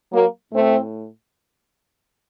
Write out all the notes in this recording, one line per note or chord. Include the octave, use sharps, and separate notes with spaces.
F#3 A#3
A2 A3 C4